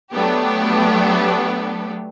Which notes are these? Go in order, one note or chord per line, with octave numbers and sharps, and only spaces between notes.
F#3 A3 B3 D4 G4